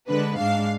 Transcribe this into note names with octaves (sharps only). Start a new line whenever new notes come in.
D3 G#3 D4 B4
G#2 G#3 D4 F5